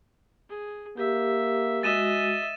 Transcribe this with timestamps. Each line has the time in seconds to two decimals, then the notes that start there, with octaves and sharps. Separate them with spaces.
0.49 G#4
0.97 A#3 G4 E5
1.83 G#3 F#4 D#5 E5 A6 D#7 E7